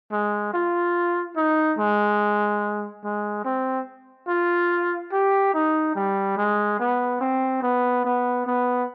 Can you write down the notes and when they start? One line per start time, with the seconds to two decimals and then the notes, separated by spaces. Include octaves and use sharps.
0.12 G#3
0.54 F4
1.36 D#4
1.79 G#3
3.04 G#3
3.45 C4
4.28 F4
5.12 G4
5.54 D#4
5.96 G3
6.37 G#3
6.80 B3
7.21 C4
7.62 B3
8.04 B3
8.46 B3